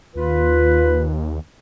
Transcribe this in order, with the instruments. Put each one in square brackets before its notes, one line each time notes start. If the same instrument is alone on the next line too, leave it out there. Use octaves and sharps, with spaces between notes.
[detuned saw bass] D#2 [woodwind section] F4 B4